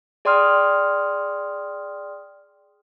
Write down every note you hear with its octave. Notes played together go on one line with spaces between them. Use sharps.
G#4 D5 G5 C6 D#6 F6